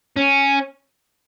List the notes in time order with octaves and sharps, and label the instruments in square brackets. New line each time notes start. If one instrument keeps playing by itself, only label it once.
[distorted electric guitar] C#4